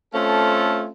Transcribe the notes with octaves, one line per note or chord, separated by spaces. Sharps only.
A3 C4 C#4 F4 A4